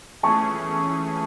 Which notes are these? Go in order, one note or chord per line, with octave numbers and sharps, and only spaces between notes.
E3 A3 C#4 G#4 A5 C#6